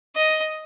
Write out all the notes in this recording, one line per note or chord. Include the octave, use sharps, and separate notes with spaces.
D#5